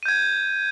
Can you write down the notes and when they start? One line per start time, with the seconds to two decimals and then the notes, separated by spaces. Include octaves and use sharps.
0.03 D#7
0.05 G6
0.08 G#6